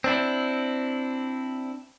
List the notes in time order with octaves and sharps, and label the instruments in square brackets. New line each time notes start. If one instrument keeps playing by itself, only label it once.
[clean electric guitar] C4 D4 E4